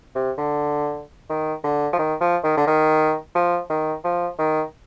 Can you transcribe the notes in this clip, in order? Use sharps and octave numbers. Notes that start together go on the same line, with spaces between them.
C3
D3
D#3
D3
F3
D#3
F3
D#3
D3
D#3
F3
D#3
F3
D#3